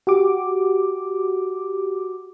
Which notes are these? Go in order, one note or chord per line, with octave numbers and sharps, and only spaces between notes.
F#4 G4 D6